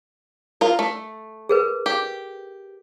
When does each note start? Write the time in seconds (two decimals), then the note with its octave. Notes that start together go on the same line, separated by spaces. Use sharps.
0.61 F4 A#4
0.79 A3
1.49 G#4 A#4 B4
1.86 G4